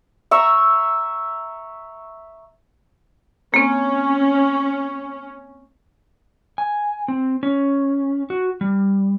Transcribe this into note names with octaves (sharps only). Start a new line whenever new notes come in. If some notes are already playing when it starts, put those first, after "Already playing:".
E5 A#5 C#6 E6
A#3 C4 C#4
G#5
C4
C#4
F#4
G3